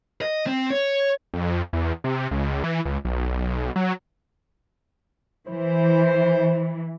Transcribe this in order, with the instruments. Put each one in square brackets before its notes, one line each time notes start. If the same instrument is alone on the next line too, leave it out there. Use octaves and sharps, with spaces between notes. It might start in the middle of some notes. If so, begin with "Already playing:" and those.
[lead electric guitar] D#5
C4
C#5
[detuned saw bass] F2
E2
C3
C#2
E3
C#2
B1
F#3
[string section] E3 [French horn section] C5